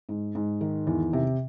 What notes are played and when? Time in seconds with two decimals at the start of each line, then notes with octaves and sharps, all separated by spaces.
0.09 G#2
0.35 G#2
0.61 D#3
0.87 E2
1.13 C3